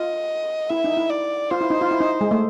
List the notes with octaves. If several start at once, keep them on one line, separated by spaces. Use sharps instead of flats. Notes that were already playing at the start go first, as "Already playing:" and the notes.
Already playing: F4 D#5
E4 E5
D#4
E4
D5
F4 C5
E4
D#4
F4
E4
D#4
G#3
A3